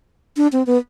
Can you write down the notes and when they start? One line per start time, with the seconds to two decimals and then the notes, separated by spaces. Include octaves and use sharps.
0.37 D4
0.52 C4
0.67 B3